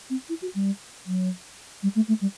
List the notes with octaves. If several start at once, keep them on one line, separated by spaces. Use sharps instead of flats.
C4
E4
F#4
G3
F#3
G3
A3
A3
G3